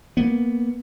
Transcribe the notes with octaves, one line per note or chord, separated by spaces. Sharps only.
A#3 B3